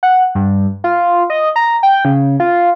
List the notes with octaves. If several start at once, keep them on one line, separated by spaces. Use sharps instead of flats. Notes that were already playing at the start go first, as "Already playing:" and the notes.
F#5
G2
F4
D#5
A#5
G5
C#3
F4